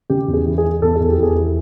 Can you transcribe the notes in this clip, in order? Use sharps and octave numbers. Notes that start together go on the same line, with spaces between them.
C#3 G4
E2
G#4
E3
G#4
E3
E2 A4
E2 G#4
G4
E2 G#4
E3